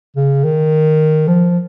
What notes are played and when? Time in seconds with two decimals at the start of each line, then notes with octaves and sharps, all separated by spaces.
0.16 C#3
0.44 D#3
1.28 F3